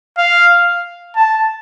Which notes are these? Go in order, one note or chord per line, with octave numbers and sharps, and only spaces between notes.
F5
A5